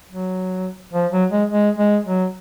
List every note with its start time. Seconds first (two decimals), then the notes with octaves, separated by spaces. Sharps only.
0.08 F#3
0.93 F3
1.12 F#3
1.31 G#3
1.50 G#3
1.78 G#3
2.06 F#3